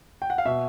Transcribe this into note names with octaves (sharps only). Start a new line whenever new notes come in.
G5
F#5
F5
B2 E5